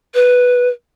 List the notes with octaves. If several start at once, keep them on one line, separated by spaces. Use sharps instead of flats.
B4